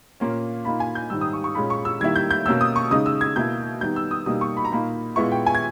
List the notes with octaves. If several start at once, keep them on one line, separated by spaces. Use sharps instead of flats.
A#2 A#3 C#4
A#2 A#3 D#4 B5
G#5
G6
G#2 D#3 G3 E6
D#6
C#6
C#6
A#2 G#3 C#4 B5
C#6
E6
D#3 G3 A#3 E4 G#6
G6
G6
B2 A#3 C#4 E6
D#6
C#6
C#3 G#3 D#4 D#6
E6
G#6
B2 A#3 E4 G6
D#3 G3 B3 D#4 G6
E6
D#6
B2 G3 A#3 D#4 D#6
C#6
B5
A#5
A#2 A#3 D#4 B5
A#2 G#3 B3 E4 C#6
G5
G#5
G#6